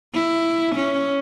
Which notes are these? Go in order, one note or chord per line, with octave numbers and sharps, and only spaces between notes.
E4
C#4